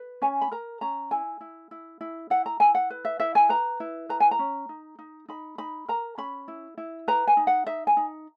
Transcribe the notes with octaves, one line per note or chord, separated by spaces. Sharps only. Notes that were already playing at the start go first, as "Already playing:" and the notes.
Already playing: B4
C#4 G#5
B5
A#4 A#5
C#4 A#5
E4 G#5
E4
E4
E4
E4 F#5
A#5
E4 G#5
F#5
B4
E5
E4 E5
G#5
B4 A#5
E4
B4 A#5
G#5
A#5
C#4
D#4
D#4
D#4 B5
D#4 B5
A#4 A#5
C#4 B5
E4
E4
B4 A#5
G#5
D#4
F#5
D#4 E5
G#5
D#4